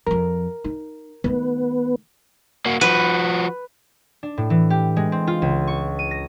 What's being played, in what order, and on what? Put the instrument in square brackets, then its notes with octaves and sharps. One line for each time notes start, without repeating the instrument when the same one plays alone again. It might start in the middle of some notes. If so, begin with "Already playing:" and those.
[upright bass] F2 F3 [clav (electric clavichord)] A#4
[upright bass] D#4
[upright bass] D#3 A3 [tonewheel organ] B3
[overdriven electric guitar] A#3 F#4
[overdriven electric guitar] F3 F#4 [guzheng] B4
[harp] D4
A2
E3
G4
G#3
C4
F4
C#2
C#6
D#7
A#6